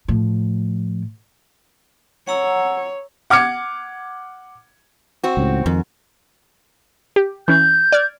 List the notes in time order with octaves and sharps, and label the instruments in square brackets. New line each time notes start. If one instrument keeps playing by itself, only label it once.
[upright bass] A2 F3
[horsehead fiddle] C#5 [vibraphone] F#5 A#5 E6
[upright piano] F#5 D6 F6 G#6 C#7
[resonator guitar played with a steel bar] C4 F#4
[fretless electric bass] C#2 A2
[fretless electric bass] F2 D#3 [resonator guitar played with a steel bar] G#2
[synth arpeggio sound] G4
[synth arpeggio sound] E3 C#4 [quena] G6
[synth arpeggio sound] D5 F6 G#6